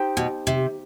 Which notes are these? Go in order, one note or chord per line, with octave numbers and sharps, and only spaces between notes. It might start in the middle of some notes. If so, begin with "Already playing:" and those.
Already playing: D#4 G4 C5 G5
B2
C3